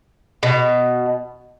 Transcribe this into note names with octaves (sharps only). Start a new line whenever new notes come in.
B2